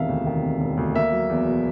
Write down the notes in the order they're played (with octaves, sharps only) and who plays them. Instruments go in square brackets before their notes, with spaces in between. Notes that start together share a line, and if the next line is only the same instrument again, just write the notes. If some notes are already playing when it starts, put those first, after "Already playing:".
Already playing: [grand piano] E1 C3 D#3 E5 F5
D2
D#3
C3
E1
D2
A#3 E5
F#3
E2
B2